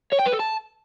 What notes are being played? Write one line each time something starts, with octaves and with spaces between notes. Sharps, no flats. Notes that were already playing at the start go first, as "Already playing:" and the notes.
C#5
G5
B4
A4
A5